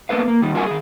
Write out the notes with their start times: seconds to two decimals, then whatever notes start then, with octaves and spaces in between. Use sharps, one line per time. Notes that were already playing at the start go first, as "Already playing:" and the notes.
0.09 A#3 B3 A4 B4 F5
0.28 A#3
0.42 D#3 G3
0.54 G3 F4 F#4 A#4 F#5 G#5
0.66 D#3 G#4